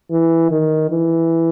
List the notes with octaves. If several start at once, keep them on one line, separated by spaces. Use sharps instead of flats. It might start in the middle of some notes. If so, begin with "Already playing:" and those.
E3
D#3
E3